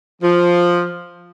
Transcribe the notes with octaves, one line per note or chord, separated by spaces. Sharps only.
F3